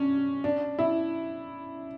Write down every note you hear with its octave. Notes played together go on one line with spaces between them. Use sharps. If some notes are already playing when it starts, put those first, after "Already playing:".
Already playing: C#4 D4
D4
E4